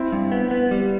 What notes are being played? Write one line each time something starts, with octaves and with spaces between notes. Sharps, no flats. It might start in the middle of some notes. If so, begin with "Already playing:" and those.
Already playing: C4 E4
G2
B3
B3
G3